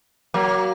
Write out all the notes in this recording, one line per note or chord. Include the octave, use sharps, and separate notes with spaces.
F#3 A#3